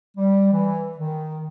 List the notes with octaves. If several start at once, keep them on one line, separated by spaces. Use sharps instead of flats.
G3
E3
D#3